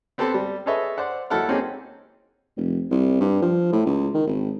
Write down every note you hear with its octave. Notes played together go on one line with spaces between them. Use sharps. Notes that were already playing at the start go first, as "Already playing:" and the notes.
B3 C4 G4 A4 B4 C5
G3
G#4 A4 B4 C#5 D#5 E5
C5 D5 F#5
D#2 F#3 E4 A4 F#5 F6
A#3 C4 C#4 D#4 G4 G#4
F1
C2
G2
F3
A2
C#2
D#3
G#1